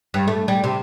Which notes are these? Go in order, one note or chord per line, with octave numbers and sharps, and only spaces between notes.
G2
A3
G3
C3